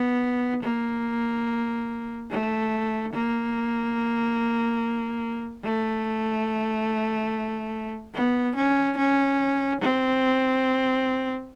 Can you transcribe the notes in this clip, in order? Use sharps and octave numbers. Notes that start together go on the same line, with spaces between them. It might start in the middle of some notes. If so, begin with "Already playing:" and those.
Already playing: B3
A#3
A3
A#3
A3
B3
C#4
C#4
C4